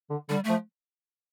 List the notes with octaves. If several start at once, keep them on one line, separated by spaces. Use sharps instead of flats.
D3
D3 G3
F3 A3